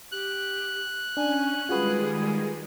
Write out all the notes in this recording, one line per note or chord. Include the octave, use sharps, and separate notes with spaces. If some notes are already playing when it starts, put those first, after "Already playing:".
G4 F#6
C#4 D4 G#5
D#3 G3 G#3 F4 F#4 G#4 B4